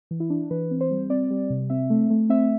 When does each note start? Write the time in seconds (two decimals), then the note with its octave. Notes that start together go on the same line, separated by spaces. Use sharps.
0.11 E3
0.20 E4
0.30 D4
0.51 E3 B4
0.71 C4
0.81 C5
0.91 G3
1.10 C4 D5
1.30 G3
1.50 C3
1.70 C4 E5
1.90 A3
2.10 A3
2.29 C4 E5